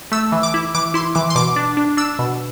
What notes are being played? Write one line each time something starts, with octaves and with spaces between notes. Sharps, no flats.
A3 E6
E3
D6
E4
E3 D6
E4 C6
E3 D6
C6
B2 D6
D4
D4
D4 E6
B2